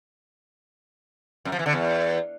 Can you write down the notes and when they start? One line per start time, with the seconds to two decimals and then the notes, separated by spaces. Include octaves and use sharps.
1.45 F#2
1.52 F3
1.59 E3
1.66 D3
1.73 E2